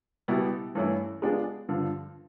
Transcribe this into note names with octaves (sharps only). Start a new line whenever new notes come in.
B2 G3 B3 E4
G2 E3 A3 C#4 E4
G#3 B3 D4 F4 G#4
G2 D3 F3